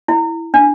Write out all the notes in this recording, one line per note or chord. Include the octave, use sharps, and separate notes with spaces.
E4
D4